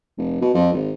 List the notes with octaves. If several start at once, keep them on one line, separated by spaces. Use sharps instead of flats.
F1
B2
F2
G#1